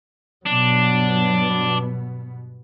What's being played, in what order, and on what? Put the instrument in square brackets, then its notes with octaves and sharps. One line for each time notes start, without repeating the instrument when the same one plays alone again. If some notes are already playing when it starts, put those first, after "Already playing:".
[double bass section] G2 B2 B3 [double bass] F#3 [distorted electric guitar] D4